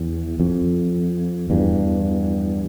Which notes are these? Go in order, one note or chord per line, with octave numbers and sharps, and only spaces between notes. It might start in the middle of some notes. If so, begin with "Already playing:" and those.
Already playing: E2
F2
E2 G2